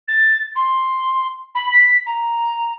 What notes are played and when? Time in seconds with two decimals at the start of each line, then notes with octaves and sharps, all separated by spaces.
0.08 A6
0.55 C6
1.55 B5
1.72 B6
2.06 A#5